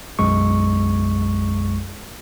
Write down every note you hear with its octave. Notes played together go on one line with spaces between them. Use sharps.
B1 F#2 G#3 C#6